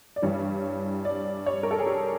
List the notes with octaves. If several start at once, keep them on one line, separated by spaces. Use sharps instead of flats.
D5
G2 E3 G3 C#5
D5
C#5
A#4
A4
G#4
G4